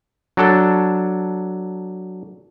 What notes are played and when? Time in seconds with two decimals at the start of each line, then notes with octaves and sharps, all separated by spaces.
0.37 F#3 D4 A4